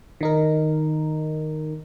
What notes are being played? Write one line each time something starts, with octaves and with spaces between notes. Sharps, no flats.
D#3 D#4 A#4